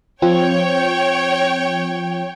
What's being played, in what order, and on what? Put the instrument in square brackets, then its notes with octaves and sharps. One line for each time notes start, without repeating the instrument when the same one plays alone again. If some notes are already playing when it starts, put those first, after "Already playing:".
[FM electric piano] F3 C4 F4 [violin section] C#5 G5